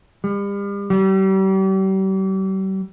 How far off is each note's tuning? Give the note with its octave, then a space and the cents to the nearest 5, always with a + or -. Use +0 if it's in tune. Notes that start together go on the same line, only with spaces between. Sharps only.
G3 +40
G3 -40